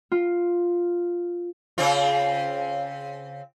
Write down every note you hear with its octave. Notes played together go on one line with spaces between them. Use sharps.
F4
C#3 C4 F4